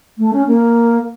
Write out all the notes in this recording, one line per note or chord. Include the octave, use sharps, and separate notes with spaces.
A3
C#4
A#3